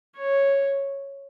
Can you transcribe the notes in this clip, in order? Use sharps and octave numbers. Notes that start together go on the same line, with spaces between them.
C#5